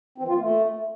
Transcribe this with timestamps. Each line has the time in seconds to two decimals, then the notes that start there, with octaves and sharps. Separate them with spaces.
0.18 C4
0.23 E3
0.28 F4
0.34 A#3
0.39 A3